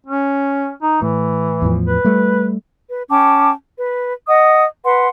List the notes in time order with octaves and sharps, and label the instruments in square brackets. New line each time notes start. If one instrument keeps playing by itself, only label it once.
[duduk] C#4
D#4
[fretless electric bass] A2 [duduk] E3
[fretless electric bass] E2 A2 F3
[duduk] B4
[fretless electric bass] G3 A3
[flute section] B4
C#4 G5 A5 D6
B4
D#5 F#5 D#6
B4 F#5 C6